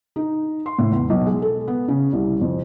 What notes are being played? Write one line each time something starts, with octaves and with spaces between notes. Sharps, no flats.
D#4
C6
A2
E2
B1
G#3
A4
B3
C#3
C2
F2